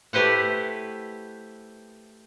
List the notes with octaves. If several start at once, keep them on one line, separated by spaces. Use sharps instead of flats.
A3 E4 G4 B4 C5 F#5